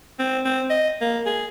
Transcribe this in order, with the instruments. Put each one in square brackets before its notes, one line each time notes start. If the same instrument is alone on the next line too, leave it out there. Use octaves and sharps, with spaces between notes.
[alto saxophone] C4
C4
D#5
A#3
G#4